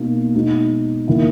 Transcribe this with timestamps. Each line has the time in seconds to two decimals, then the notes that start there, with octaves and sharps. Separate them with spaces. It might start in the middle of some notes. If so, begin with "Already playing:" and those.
Already playing: B2 A#3 D#4
0.35 B2 G#3 D#4
1.08 D#3 A#3 C#4 E4